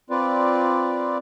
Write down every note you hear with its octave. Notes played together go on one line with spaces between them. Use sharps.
C4 F4 B4 D5